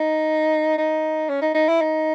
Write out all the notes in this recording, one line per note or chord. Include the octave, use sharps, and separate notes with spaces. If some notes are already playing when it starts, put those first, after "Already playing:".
Already playing: D#4
D#4
C#4
D#4
D#4
E4
D#4